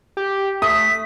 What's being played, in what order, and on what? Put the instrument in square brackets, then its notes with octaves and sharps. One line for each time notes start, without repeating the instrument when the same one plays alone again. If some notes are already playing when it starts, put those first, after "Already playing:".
[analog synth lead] G4
[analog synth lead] A3 [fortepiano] D#6 [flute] B6